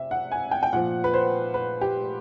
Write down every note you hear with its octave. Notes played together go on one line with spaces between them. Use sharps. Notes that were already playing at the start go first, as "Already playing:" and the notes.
Already playing: C3 E5
F#5
G#5
G5
G5
A#2 F3 F#5
B4
C5
B4
G4